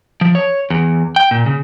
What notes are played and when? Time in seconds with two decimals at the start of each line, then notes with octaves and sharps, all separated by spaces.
0.21 F3
0.35 C#5
0.70 E2
1.16 G5
1.31 A#2
1.46 C#3